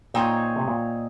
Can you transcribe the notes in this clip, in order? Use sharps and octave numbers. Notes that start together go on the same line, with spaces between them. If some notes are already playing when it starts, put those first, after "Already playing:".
A#2 C4 D#4 G#4 C#5
C3
A#2